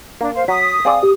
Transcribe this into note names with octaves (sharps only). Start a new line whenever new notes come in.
A#3 D4
C5 F5
F#3 D#6 B6
C4 G#4 D5 F5
G4